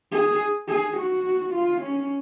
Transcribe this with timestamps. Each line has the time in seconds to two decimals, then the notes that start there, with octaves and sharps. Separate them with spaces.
0.12 G#4
0.68 G#4
0.97 F#4
1.54 F4
1.82 C#4